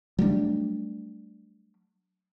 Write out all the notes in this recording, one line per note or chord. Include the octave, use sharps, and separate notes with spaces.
F#3 G3 A3 D4